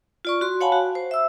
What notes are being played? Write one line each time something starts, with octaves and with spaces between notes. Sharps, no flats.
F4 D5 C#6
F#4 C6
C#5 F5 F#5 G#5 A5 B5
F#4
C5
E5 E6